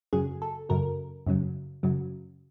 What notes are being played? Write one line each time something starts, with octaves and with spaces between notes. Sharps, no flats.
F#2 C#3 F#3 G#4
A4
F#2 C#3 F#3 A#4
F#2 C#3 F#3
F#2 C#3 F#3